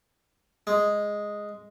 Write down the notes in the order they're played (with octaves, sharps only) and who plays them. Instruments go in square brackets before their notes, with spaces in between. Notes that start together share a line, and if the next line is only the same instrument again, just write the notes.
[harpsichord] G#3